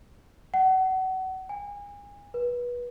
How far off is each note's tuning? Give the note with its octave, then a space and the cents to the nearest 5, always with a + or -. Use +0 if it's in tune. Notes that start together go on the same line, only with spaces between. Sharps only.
F#5 +30
G#5 -35
B4 -25